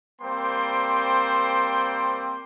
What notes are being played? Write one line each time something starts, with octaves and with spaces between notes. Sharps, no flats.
G3 A#3 C4 C5 G5 C6